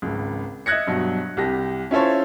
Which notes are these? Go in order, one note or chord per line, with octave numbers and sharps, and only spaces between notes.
G#1 C#2
D#5 E5 F#6 G#6 A#6 C#7
G2 B2 F#3
C2 G4 A#6
C#4 E4 F4 A4 C5 C#5